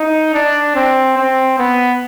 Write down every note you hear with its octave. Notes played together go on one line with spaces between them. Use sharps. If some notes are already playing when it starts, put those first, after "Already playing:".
Already playing: D#4
D4
C4
C4
B3